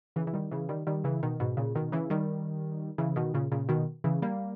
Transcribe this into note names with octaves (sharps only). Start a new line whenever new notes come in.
C#3 E3
E3
D#3 G3
C#3 E3
D#3 G3
D#3 G3
C#3 E3
B2 D#3
G#2 B2
A#2 C#3
B2 D#3
C#3 E3
D#3 G3
C#3 E3
B2 D#3
A#2 C#3
A#2 C#3
B2 D#3
C#3 E3
G3 A#3